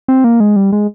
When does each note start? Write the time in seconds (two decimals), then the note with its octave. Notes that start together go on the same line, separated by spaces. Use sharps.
0.08 C4
0.24 A#3
0.40 G#3
0.56 G3
0.73 G#3